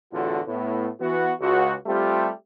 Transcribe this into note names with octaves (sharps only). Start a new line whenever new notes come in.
E2 A2 D3 F4 F#4 A4
A2 B3
E3 B3 F#4
C#2 F#4
G3 A3 C4 F4 G4